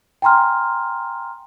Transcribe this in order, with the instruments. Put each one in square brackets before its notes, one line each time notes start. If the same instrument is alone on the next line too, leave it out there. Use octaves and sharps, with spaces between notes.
[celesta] G5 G#5 A#5 C6 F6